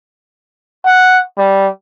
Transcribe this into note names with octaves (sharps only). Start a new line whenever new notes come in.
F#5
G3